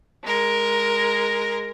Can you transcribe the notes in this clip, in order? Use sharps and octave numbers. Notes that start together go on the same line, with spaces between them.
G#3 A#4